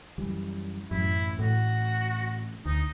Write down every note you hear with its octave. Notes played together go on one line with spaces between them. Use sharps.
F#2 E3 G3
A1 F#2 E4
A2 F#4
D2 D#4